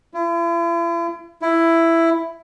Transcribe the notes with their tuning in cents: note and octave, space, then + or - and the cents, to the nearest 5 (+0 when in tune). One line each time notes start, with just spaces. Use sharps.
E4 +45
E4 +10